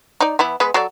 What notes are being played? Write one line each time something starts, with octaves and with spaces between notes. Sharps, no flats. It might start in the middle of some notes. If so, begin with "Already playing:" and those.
D#4 D5
E3 B3 E4
G#3 B3 B4
F#3 A4 D5